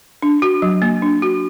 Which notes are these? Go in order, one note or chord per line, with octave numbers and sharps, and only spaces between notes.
D4
F#4
F#3
A#3
D4
F#4